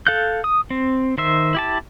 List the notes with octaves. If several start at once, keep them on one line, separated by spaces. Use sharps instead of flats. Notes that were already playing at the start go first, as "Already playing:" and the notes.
A4 F5 F#6 G6
D#6
C4
D#3 C5 E5
E4 G4 A5